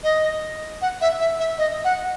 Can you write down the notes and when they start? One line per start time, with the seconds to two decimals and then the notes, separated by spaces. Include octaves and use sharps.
0.04 D#5
0.82 F#5
1.01 E5
1.20 E5
1.40 E5
1.58 D#5
1.85 F#5